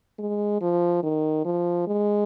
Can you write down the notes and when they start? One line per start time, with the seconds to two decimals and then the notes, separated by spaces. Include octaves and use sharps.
0.19 G#3
0.61 F3
1.03 D#3
1.45 F3
1.88 G#3